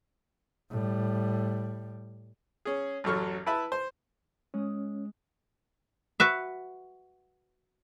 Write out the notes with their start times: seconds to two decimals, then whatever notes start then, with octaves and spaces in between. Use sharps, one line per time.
0.71 A2 G3
2.65 C#4 G#4
3.04 A1 F#2 F#3 A4 C#6 F6
3.46 E4 B4 E5 A5 B5
3.72 C5
4.54 G#3 C#4 D#6
6.20 F#4 B4 E5